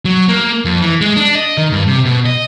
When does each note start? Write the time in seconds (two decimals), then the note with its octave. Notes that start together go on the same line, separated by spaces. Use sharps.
0.05 F#3
0.28 A#3
0.65 F2
0.81 E3
1.01 G#3
1.16 D4
1.35 D#5
1.58 D#3
1.72 G2
1.87 C3
2.05 B2
2.26 D#5